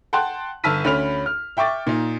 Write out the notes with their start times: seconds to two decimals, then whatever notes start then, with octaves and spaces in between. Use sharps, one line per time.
0.13 F#5 G5 A5 C6 F#6
0.64 G1 A5 E6 F6 B6 D#7
0.84 D2 C#4 B5 F6 F7
1.26 F6
1.57 E5 G5 C#6 D6 A6
1.87 A#2 D#4